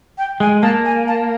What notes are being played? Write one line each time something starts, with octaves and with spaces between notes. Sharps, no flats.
G5
G#3 G#5
A#3 A5
G#5
A5